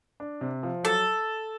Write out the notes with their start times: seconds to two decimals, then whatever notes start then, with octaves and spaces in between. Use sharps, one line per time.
0.20 D4
0.41 C3
0.63 F3
0.83 F#3 A4